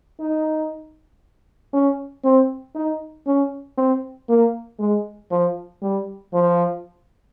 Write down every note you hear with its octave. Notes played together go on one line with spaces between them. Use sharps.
D#4
C#4
C4
D#4
C#4
C4
A#3
G#3
F3
G3
F3